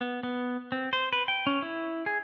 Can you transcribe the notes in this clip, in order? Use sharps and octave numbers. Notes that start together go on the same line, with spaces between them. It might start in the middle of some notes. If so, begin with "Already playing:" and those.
B3
B3
C4
C5
B4
G5
C#4
E4
G#4